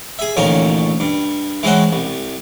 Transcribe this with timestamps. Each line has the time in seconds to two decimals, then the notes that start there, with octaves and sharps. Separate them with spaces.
0.19 G#4 E5
0.37 A1 D2 A#2 D#3 F3 C#4
1.00 G2
1.63 E3 G#3 C4 C#4 F#4
1.93 C2